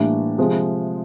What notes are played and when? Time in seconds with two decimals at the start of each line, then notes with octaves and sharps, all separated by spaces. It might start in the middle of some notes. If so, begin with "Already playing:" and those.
Already playing: A2 E3 G3 A#3 D4
0.38 C3 F3 G#3